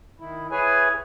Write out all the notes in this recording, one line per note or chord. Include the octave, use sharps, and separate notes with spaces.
D#3 E4
E4 G#4 B4 C#5 G#5